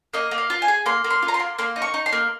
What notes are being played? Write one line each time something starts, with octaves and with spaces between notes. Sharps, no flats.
A#3 D#5
A#3
F5
F4
G#5
G#4
A#3 C6
A#3
C6
F4
A#5
C6
A#3
A#3 C6
D#4
C#6
D#4
C6
A#3